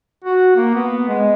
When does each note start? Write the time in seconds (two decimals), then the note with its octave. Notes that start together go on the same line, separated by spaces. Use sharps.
0.24 F#4
0.56 A#3
0.75 B3
1.09 G#3